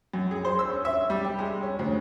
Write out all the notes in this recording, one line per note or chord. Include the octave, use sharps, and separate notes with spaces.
F#2
G#4
C5
E6
C#4
E5
G3
G4
G#3
C#4
D2